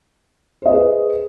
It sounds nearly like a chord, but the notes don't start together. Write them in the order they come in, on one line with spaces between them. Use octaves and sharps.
C5 D#5 B4 G#4